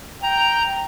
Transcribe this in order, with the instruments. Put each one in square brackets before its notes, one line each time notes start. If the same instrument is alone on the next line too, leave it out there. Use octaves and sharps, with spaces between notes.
[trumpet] G5 [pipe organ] A#5